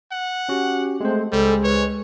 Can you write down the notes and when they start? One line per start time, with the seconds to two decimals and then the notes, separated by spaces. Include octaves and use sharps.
0.12 F#5
0.49 C#4 F#4 G4
1.00 G#3 A3 C4 C5
1.32 C#2 G3 G#3 A4 C5
1.64 B4 C#5